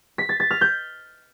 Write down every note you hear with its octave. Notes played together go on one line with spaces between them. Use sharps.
B6
A6
A6
F6
G6